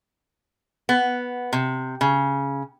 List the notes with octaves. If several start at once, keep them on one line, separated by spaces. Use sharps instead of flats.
B3
C3
C#3